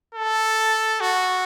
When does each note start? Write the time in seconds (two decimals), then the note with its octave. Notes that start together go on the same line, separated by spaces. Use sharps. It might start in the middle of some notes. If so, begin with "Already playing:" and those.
0.14 A4
1.00 F#4